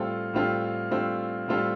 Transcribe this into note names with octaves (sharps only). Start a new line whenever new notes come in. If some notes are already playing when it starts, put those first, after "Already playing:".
Already playing: A2 G3 C4 F4 A4
A2 G3 C4 F4 A4
A2 G3 C4 F4 A4
A2 G3 C4 F4 A4